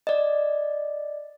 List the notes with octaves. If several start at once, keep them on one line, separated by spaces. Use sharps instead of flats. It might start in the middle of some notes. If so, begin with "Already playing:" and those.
D5 D#5